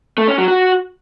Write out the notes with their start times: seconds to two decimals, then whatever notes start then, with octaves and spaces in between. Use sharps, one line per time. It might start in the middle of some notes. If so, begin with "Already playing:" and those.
0.18 A3
0.28 C#4
0.38 F#3
0.48 F#4